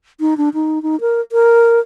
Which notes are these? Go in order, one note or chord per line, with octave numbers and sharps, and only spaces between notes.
D#4
D4
D#4
D#4
A#4
A#4